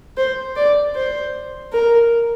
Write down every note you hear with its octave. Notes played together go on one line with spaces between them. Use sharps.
C5
D5
C5
A#4